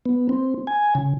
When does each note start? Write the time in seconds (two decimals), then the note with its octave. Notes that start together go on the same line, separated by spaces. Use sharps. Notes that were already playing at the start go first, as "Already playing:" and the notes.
0.06 B3
0.29 C4
0.67 G#5
0.95 C#3